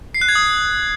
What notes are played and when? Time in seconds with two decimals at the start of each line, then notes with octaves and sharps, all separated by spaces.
0.14 C7
0.21 F#6
0.28 G#6
0.35 D#6